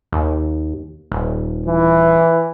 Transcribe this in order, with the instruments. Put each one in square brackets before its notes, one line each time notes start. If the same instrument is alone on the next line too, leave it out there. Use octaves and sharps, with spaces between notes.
[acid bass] D#2
D#1
[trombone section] E3